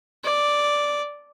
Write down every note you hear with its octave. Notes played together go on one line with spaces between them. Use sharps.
D5